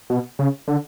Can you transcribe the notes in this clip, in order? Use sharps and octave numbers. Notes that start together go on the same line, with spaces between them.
B2
C#3
D3